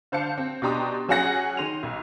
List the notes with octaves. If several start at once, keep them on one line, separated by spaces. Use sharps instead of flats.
D3 C5 F5 A5 C#7
C4
B2 D4 G4 A#5 C6 D#6
F#3 C#4 G#4 F#5 A#6 C#7
D#3 C6 D#7 F7
B1